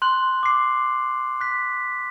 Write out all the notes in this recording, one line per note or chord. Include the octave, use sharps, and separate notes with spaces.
C6 F#6 F#7
D6 C7
F#6 B6